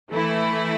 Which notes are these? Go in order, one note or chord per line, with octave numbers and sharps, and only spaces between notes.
E3 A3 E4